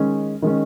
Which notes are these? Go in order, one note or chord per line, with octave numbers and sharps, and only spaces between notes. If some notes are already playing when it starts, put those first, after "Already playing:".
Already playing: D#3 G#3 C#4
D#3 G#3 C#4